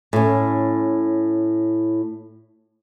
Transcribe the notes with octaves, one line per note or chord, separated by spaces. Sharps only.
A2 C#4